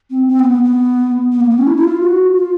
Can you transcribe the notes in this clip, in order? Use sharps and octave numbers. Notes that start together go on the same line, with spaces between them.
C4
C4
B3
B3
B3
B3
A#3
B3
C#4
E4
E4
F4
F#4
F4